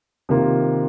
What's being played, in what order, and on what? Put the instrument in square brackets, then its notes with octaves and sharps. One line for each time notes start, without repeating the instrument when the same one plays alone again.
[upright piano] C3 D#3 A#3 F4